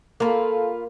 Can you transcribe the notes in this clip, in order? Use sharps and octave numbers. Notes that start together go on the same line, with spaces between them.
A#3 F4 A4 B4